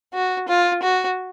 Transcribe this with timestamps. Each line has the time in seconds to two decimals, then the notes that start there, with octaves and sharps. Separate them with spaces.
0.13 F#4
0.48 F4
0.82 F#4